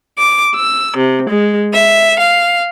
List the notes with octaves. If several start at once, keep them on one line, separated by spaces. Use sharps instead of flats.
D6
E6
C3
G#3
E5
F5